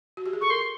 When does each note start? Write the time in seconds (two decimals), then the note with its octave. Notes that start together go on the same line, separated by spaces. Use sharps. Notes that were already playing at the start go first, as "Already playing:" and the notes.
0.17 F#4
0.26 G4
0.33 G#4
0.41 A4 C#6
0.50 A#4 C6